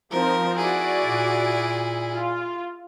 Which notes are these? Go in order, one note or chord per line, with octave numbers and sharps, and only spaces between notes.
F3 C4 D#4 A#4
E4 F#4 G#4 D5
A#2
F4